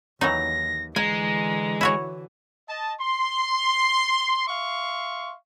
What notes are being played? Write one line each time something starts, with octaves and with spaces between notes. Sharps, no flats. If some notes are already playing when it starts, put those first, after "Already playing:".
D#2 E3 F#3 D#4 A#6
D3 E3 G#3 G#5 A#5
E4 F#4 C#5
D#5 A5
C6
E5 F5 C6 C#6